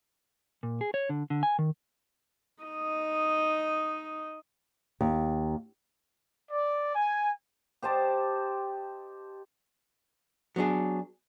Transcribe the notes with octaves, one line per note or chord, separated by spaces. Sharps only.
A#2
G#4
C#5
D3
D3
G#5
D#3
D#4 D#5
D#2
D5
G#5
G4 C5 D#5 A5
F#3 B3 D4 G#4